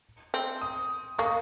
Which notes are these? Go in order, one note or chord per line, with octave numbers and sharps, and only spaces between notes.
C4
D#6
A#3 C#6
D#6